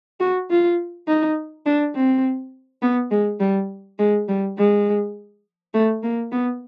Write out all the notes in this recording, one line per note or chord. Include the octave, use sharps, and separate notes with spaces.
F#4
F4
D#4
D4
C4
B3
G#3
G3
G#3
G3
G#3
A3
A#3
B3